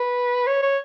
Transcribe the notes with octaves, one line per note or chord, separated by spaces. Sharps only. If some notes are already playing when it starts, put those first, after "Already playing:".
Already playing: B4
C#5
C#5